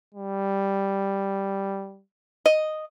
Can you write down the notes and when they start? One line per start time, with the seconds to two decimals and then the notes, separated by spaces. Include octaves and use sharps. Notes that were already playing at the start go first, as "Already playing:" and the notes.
0.14 G3
2.46 D#5